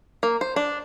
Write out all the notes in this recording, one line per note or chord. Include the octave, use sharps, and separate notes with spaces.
A#3
C5
D4